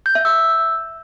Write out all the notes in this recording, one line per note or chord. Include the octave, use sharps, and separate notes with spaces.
G6
E5
E6